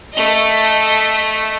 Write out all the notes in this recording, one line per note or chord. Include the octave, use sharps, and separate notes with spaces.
A3 D#5